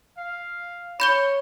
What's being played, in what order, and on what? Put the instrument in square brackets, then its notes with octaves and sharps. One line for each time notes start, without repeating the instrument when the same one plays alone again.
[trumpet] F5
[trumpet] C#5 [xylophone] B5 G6 G7